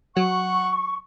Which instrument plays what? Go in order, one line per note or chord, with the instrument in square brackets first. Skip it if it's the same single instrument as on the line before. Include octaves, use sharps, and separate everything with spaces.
[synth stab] F#3 [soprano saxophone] F#5 [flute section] C#6